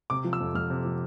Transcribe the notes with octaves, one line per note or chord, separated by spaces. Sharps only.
C3 D6
F3
E6
F2
F2 F6
C3
F3